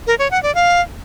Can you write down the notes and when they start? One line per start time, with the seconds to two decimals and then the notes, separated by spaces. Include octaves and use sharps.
0.07 A#4
0.19 C#5
0.31 F#5
0.43 D5
0.55 F5